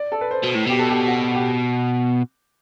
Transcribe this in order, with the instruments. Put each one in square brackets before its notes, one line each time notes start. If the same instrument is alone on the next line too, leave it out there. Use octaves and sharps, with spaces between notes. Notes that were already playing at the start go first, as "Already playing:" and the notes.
Already playing: [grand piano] D5
A4
B4
C5
[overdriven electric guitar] B2
A2
[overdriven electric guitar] B2 [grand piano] G4
[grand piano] A4
G4
F#4
G4